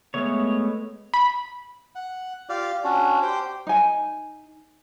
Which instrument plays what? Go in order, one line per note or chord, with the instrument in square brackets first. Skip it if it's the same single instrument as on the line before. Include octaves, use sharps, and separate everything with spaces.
[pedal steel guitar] G#3 A3 B3 C#5
[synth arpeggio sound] B5
[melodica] F#5
F4 G4 D5 F5
C#4 D4 F#4
G4 C5 G5
[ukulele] D#4 G#5